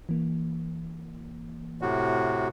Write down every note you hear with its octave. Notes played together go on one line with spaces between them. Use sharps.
E3 A#3
A2 C3 F#4